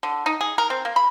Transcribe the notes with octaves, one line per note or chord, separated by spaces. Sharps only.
D3
D#4
G#4
A#4
C4
A#3
B5